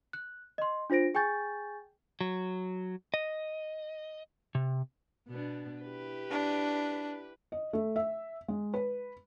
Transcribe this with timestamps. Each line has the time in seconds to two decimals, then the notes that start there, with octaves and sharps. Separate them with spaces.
0.13 F#6
0.58 D#5 C6
0.90 D4 F4 C5 A#6 D7
1.14 G#4 G5 G#5 C#6 G6 A6
2.21 F#3
3.14 D#5
4.55 C3
5.28 B2 B3 D4
5.81 E4 G4 B4
6.31 D4
7.52 D#5
7.73 A3
7.96 E5
8.48 G#3
8.74 B4